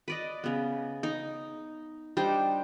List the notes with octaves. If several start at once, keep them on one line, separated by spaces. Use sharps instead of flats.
B4 D5 D#5
C#3 B3
D#4
G3 D4 D#4 C5